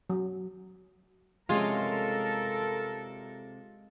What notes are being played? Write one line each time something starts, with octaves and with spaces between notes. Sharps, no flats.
F#3
C3 G#3 C#4 F4 A4 A#4